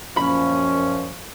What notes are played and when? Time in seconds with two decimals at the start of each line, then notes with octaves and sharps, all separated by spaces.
0.17 F#2 A#2 F3 C#4 B5